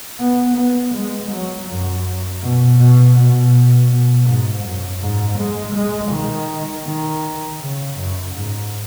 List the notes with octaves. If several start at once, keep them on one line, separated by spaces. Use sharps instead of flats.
B3
B3
G#3
F#3
F#2
B2
B2
B2
B2
G#2
F#2
G#2
G#3
G#3
D#3
D#3
C#3
F#2
G#2